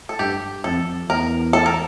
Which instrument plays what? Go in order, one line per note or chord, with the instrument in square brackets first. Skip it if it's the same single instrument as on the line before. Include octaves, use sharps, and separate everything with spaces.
[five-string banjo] A4
[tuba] G2 [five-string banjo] G4
[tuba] F2 [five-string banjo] A4
[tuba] E2 [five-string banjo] A#4
[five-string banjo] A4
A#4